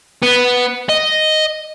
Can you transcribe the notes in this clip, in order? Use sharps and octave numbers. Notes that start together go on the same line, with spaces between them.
B3
D#5